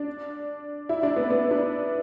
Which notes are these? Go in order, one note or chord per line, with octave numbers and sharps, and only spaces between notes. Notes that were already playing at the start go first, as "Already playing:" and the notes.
Already playing: D4
E4
D4
B3
B3
D4